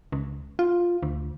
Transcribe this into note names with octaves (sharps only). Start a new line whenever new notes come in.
C#2
F4
D2